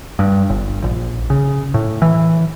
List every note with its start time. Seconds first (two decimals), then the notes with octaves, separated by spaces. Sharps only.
0.19 G2
0.49 G1
0.84 A#1
1.30 C#3
1.74 A2
2.02 E3